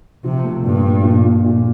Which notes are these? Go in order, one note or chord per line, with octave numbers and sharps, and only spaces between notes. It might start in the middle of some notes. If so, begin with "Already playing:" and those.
C3 F3
A3
G2 A#2
A3
A#2
A#2
A#2